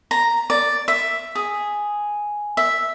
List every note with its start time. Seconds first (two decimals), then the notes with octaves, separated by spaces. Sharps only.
0.11 A#5
0.50 D5
0.88 E5
1.35 G#4
2.57 E5